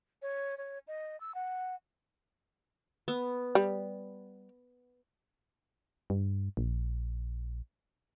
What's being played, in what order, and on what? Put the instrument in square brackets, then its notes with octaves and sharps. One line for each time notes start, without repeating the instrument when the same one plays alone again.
[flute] C#5
C#5
D#5
E6
F#5
[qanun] B3
[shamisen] G3
[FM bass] G2
A#1